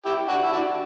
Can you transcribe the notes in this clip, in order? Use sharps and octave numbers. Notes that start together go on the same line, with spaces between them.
E4 G4
D4 F#4
E4
D4 F#4